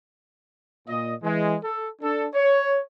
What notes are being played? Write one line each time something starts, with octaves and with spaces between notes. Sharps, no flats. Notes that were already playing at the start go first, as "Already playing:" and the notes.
A#2 D#5
E3 G#3
A4
D4 A4
C#5